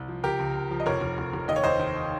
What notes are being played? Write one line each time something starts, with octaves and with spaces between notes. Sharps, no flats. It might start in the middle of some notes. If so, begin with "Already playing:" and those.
Already playing: C2
F3
C#2 G4 A#4
C#2
C#2
F3
D#5
F1 A#4 C#5
F1
F1
F1
D#2 D#5
C#5
D#2 C5 D#5
D#3